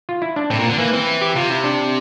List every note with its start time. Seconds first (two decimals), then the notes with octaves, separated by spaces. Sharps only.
0.09 F4
0.22 E4
0.36 D4
0.50 A2 C4
0.59 A#2
0.69 D3
0.78 E3 A#3
0.93 E3 C4
1.21 G4
1.35 C3 F4
1.50 E4
1.64 D4